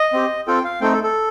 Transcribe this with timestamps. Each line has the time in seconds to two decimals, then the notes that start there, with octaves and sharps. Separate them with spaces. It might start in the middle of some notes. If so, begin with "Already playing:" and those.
Already playing: D#5
0.13 C4 G4
0.47 C4 F4 A4 G5
0.64 F5
0.81 A3 C4 D#4 A4 G5
0.93 A4
1.04 A4